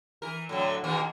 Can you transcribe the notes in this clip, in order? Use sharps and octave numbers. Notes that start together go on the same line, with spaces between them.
E3 A#4
A2 D3 F#3
D#2 B2 A#3